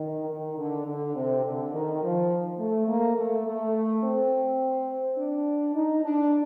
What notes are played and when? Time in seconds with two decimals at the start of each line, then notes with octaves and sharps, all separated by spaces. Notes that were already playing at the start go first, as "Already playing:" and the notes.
Already playing: D#3
0.30 D#3
0.58 D3
0.86 D3
1.16 C3
1.45 D3
1.73 D#3
2.02 F3
2.59 A3
2.87 A#3
3.17 A3
3.45 A3
4.03 C4
5.18 D4
5.75 D#4
6.03 D4